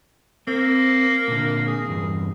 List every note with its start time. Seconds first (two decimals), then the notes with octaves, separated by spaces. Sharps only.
0.47 A#3 C4
1.28 A#2 D3
1.67 G#4
1.88 E2 G2